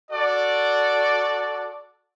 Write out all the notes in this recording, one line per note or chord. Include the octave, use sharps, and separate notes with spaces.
F#4 A4 D5